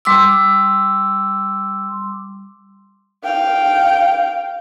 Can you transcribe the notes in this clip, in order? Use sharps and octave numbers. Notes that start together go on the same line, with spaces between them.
G3 C6 D6 E6
F5 G5